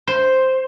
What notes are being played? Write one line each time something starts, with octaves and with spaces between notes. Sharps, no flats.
C5